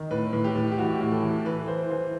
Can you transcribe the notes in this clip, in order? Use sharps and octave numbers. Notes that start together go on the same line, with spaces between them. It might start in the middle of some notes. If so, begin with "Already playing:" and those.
Already playing: D#3
A2 B4
A2
G4
A2
G4
E3 F#4
G4
A2
A4
E3
A4
E3 B4
E3 C5
E3 C5